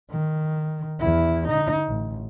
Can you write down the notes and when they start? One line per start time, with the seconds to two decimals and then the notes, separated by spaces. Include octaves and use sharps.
0.11 D#3
1.00 E2 E4
1.48 D3 D#4
1.87 A1